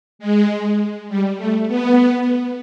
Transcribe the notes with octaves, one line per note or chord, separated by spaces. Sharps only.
G#3
G3
A3
B3